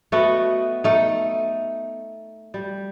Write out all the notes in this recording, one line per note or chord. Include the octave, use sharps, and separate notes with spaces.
A3 B3 F#4 D#5
A3 D#4
G3